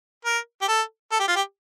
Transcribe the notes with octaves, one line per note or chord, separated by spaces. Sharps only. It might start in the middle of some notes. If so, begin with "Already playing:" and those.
A#4
G4
A4
A4
G4
F4
G4